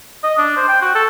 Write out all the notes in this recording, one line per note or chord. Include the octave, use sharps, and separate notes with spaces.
D#5
D4
C5
G5
F#4
A4